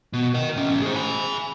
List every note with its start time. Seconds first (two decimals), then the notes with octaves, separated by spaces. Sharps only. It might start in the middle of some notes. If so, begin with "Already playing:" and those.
0.13 B2
0.34 A#4 D#5
0.57 A2 C#4
0.82 G#4 C5
0.96 G#5 B5